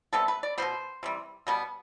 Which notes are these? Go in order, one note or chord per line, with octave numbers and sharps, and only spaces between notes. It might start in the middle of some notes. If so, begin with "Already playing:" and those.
C3 G3 B3 A4
B4
D5
B2 G3 B3 C5
C3 E3 G3
B2 G3 B3